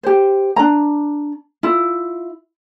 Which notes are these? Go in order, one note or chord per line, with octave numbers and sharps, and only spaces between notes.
G4 C5
D4 A#5
E4 F4